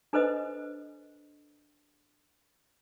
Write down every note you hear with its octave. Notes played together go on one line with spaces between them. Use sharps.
D4 A4 B4 C5 D#5 D#6